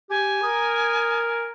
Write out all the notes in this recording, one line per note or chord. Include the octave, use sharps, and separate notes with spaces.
G4 G#5
A#4 D#6